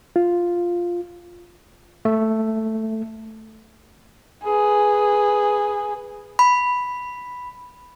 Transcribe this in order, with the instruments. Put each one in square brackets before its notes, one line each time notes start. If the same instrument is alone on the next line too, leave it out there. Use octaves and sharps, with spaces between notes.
[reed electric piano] F4
[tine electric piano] A3
[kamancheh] G#4 B4
[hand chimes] B5